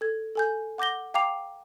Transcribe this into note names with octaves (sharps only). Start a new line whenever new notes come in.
A4 G#6
A4 G#5 G6
F#5 D6 G6 A#6 G7
F5 G5 A#5 D6 C7 F7